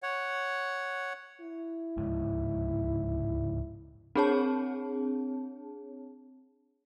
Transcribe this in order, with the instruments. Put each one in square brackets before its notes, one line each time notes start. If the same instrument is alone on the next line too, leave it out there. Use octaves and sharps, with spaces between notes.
[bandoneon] C#5 F#5
[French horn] E4
[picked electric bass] D1 C#2 G#2
[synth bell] C4 D4 G#4 C#5 A5